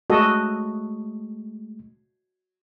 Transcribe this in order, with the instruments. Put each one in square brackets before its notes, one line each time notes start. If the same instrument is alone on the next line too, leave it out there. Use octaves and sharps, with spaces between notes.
[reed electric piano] G#3 A3 [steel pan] F#4 A4 D#5